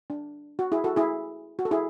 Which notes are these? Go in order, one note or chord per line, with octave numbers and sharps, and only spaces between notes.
D4
F#4
E4 G#4
F#4 A4
E4 G#4
F#4
A4
E4 G#4